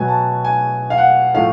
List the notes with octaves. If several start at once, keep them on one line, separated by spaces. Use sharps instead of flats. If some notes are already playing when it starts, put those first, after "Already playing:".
Already playing: B2 F#3 B3 G#5
A5
G#5
F5
F#5
A2 F3 A3 F5